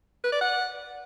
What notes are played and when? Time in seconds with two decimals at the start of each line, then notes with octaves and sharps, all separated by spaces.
0.24 B4
0.32 D5
0.41 F#5